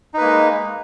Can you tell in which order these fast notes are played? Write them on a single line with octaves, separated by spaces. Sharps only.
D#4 B4 A#3 G#3